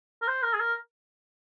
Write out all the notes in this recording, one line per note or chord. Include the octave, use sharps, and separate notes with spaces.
A#4
C5
A#4
G#4
A#4